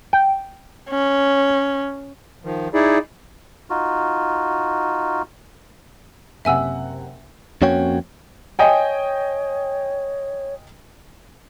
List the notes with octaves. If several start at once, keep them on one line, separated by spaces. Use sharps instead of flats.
G5
C#4
D#3 F3
D#4 E4 G#4 D5
D#4 F4 F#4
F#1 C3 E5 F#5 G#5 E6
F2 A#3 C#4 F#4 C#5 G5
C#5 D#5 G5 G#5